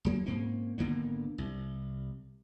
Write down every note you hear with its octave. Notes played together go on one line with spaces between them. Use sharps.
D#1 F#3 A#3
G#2 A#3 C4 C#4
G#1 D3 A#3 B3
C2